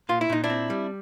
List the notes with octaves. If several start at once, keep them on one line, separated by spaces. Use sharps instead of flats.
A#2 F4
E4
A#2 D#4
D4 E4
C4
G3